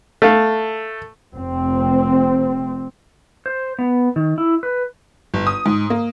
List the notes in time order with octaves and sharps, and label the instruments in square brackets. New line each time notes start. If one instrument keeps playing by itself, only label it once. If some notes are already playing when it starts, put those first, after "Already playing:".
[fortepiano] A3 F5
[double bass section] F1 C4
[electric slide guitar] C5
B3
D#3
E4
B4
[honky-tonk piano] G1
D#6
G#2
A#3